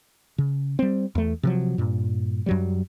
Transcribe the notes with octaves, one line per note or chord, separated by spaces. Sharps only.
C#3
G3 C4
E2 A3
C3 F3 F#3
G2 A#2
F#2 F#3 G3